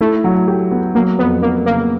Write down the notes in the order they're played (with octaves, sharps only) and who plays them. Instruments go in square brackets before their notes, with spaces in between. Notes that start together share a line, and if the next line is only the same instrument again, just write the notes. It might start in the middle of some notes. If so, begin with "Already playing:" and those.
[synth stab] A3 [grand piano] E4
[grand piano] F#3
G4
B3
[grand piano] F#3 [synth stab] A#3
[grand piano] F2 [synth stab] B3
[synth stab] A#3 [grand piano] B3
[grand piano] C#3 [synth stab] A#3